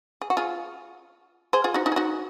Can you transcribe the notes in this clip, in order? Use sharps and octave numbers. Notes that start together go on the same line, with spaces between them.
G#4
F#4
F4 G#4
G#4 C5
F4 G#4
D#4 F#4
D#4 F#4
G#4
D#4 F#4